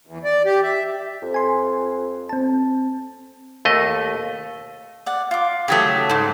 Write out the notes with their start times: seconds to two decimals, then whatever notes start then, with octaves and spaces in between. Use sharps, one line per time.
0.07 E2
0.24 D5
0.45 G4
0.63 E5
1.22 F2
1.34 G#5 C6
2.29 C4 A5
3.65 D#2 A3 D#5
5.06 D5 F#5
5.31 F4 D6
5.68 C#3 F#3 A3 G4 C#5 D#6
6.10 G#2 C#3